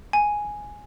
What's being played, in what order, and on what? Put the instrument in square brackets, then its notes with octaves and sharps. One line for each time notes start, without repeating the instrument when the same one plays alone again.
[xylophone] G#5